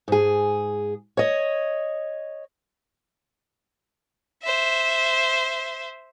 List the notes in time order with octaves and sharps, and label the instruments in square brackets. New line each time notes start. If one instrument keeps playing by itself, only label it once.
[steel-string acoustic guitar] G#2 G#4
C#5 D#5
[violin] C5 E5